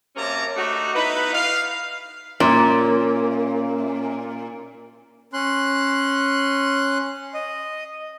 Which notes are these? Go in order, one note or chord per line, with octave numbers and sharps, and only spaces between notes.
F#2 C3 A#3 C#4 A5 A#5
A3 D4 D#4 F#4
B3 D#4 E4 B4
F5
A#2 C#4
C#4 C6 F#6
D#5